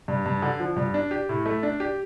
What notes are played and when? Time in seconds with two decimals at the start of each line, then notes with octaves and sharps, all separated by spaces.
0.08 G2
0.26 G2
0.42 D3
0.60 F3
0.76 G2
0.94 D4
1.11 G4
1.29 A2
1.46 A3
1.63 D4
1.80 G4